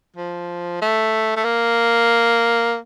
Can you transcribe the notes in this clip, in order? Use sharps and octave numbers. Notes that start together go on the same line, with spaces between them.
F3
A3
A3
A#3